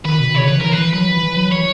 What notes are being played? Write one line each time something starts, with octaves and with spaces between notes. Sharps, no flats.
D#3 B4
B2
C#3 C#5
E3 B4
E3 A#4
B4
E3
F#3 B4
E3
E3
F#3
E3 C#5